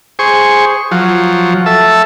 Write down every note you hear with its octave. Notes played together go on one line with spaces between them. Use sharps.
G#4 C5 C#6
F3 F#3
A4 E5